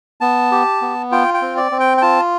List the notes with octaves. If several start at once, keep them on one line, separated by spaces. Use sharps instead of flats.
B3 A5
G4
B3
F4 G5
G5
C4
D5
C4
G5
G5
F4 A5